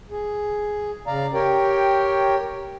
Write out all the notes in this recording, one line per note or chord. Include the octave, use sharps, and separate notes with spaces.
G#4
C#3 D5 F5 A#5
G4 A#4 C#5 G5